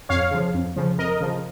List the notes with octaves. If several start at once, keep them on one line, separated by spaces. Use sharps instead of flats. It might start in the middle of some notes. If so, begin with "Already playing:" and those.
F2 C#5 F5
C#3 F3
F2
C#3 F3
F2 A#4 D#5
C#3 F3